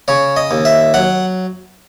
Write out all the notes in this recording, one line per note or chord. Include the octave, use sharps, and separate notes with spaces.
C#3 C#5
D#5
D#2
E5
F#3 F#5